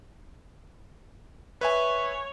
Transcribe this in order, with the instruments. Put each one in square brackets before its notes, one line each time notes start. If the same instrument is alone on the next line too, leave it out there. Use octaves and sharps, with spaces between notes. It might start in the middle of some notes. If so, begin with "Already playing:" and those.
[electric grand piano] B4 E5 G#5 [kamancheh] C#5